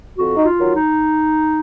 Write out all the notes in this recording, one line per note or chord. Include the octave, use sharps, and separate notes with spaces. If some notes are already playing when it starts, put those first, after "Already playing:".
F2 F#4
D#4
F4
D#3 F#3
D#4